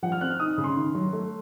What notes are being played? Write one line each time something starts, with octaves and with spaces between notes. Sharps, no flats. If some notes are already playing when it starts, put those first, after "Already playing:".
F3 F#5
F6
C4 F#6
F6
D#4 D#6
C#3
C6
D#3
F#3
A3